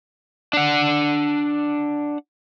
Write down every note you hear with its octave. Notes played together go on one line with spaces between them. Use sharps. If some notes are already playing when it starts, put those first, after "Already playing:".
D4 F#5